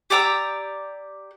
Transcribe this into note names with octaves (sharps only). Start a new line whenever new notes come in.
G4 D5 A#5 E6